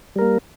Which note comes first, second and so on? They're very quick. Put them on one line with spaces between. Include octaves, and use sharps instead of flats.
G3 A#4 A#3